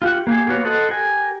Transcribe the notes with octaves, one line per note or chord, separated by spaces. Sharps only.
F4 G4 F#5
A#3 G4 G#4
A#3 B3 F#4 C#5
A4 C5 D#5 F#5
G4 A#4 G#5